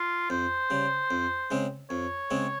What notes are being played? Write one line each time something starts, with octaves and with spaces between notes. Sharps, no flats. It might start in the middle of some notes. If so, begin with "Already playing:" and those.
Already playing: F4
F2 C5
C#3 G3
F2
C#3 G#3 C4
F2 C#5
C#3 G#3 C4